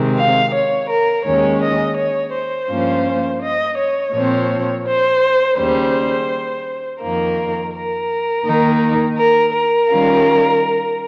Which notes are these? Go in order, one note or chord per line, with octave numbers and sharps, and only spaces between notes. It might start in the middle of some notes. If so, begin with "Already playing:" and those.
Already playing: C3 D#3 G#3 C4
F5
C#5
A#4
D#2 D#3 G#3 C#4 C#5
D#5
C#5
C5
G2 F3 A#3 C#4 F4
D#5
C#5
A#2 F3 C4
C5
D#2 C#3 G3 C5
F2 D#3 A#3 A#4
A#4
D#3 A#3 D#4
A#4
A#4
D#3 G3 C#4 F4